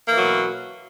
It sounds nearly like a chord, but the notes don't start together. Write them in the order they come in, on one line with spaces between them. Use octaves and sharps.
A#3 E3 F#3 B2